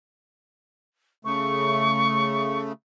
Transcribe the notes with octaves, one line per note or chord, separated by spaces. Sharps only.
C#3 A3 C#6